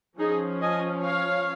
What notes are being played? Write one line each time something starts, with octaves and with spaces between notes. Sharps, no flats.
F3 C#4 D#4 G#4
D#5 G#5
C#5 F5